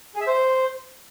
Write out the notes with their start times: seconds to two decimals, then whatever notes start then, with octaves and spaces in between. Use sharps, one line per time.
0.15 G#4
0.21 E5
0.27 C5